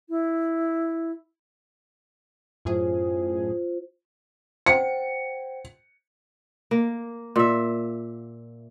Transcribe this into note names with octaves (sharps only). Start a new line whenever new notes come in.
E4
F#2 A2 F4 G#4 C5
C5 F#5 G5 C#7
A#3
A#2 E5